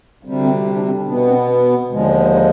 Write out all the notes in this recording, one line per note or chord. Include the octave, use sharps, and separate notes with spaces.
D2 C3 G3
C4
C4
D4
C4
D4
B2 B3 D4
C4
D#2 D3 F3 G#3
D#4